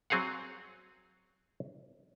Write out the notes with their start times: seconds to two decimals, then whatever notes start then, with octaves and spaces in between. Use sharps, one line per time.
0.10 F#3 C4 G#4 F5 F#5